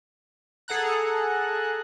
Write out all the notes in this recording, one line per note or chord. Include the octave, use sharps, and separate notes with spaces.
G#4 A4 F#5 A#5 F#6